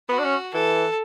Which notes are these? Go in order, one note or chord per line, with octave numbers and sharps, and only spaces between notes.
B3 F#4
D4
C#4
E3 A4